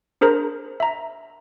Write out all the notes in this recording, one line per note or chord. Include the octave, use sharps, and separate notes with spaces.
D4 G#4 A#4 C5 A#5
E5 A#5